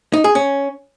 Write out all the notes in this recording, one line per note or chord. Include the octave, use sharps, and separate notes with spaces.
D#4
G#4
C#4